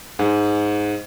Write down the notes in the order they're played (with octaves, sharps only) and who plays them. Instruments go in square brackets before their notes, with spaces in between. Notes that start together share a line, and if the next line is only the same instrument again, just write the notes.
[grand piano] G#2